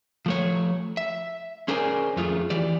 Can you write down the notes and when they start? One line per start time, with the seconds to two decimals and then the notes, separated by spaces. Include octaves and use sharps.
0.26 F3 A3 C#5
0.97 E5
1.68 C#4 G#4 A#4 C5 D5 G#5
2.17 F2 A3 F4 G#4
2.50 E3 G4 D5